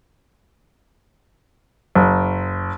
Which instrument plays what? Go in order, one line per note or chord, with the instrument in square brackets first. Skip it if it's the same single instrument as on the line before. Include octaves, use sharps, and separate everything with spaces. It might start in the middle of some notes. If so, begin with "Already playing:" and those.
[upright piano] F#1